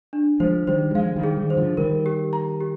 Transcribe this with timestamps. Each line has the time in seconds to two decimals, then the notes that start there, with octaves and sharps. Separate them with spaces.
0.13 D4
0.40 F3 G#3 C5
0.67 D#3 G3 C5
0.91 G3
0.95 F3 G#3 F5
1.16 D#3 G3
1.23 G#4
1.36 D#3 G3
1.50 C5
1.57 D3 F3
1.77 D#3 G3 A#4
2.06 G4
2.33 A#5
2.61 G4